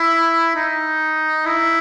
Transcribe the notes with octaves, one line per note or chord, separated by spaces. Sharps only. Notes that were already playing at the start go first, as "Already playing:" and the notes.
Already playing: E4
D#4
E4